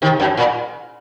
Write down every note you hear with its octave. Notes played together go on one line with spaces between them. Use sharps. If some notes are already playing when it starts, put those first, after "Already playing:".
C3 D#3
F#2
A#2